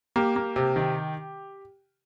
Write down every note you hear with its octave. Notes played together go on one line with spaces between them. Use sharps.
A#3 G4
A#3
C3
D#3